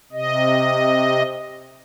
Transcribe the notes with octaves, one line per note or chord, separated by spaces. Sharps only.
C3 D#5